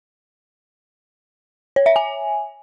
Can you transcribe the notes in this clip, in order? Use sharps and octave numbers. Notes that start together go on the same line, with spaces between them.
C#5
E5
G#5